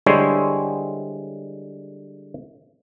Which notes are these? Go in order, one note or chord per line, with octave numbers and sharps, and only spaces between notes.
D3 G3 G#3 E4 C5 C#5